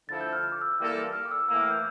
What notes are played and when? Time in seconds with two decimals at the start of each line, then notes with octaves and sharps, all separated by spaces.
0.09 D3 F3 A3 E4 A4 A6
0.21 G6
0.33 F6
0.43 F6
0.52 D6
0.61 E6
0.78 E3 G3 A#3 F4 A4
1.13 F6
1.25 D6
1.31 E6
1.48 A2 E3 A#3 E6
1.59 F6
1.71 G6